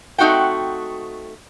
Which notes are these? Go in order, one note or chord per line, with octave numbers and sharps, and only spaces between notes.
A3 C4 D#4 F#4 F#5 G5